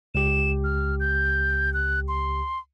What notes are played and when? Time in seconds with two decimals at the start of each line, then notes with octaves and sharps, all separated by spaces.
0.15 C#2 G4 E7
0.64 F6
1.00 G6
1.74 F#6
2.08 C6